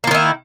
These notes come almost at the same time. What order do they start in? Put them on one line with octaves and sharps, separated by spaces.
A#3 F3 D#3 E4